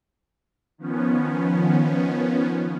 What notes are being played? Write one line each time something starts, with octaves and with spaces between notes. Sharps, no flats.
D#3 F3 B3 C#4